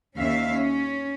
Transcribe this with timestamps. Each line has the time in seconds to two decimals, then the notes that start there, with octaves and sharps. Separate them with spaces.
0.17 D#2 C#4 E5 F5
0.53 C#4